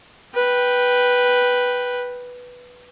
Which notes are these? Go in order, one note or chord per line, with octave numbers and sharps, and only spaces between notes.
B4 G5